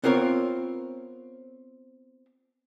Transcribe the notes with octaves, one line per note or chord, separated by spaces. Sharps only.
B3 C4 F4 A#4 C#5